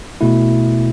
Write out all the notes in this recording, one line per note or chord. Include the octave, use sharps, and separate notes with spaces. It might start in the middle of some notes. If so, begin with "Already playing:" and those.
B2 A3 E4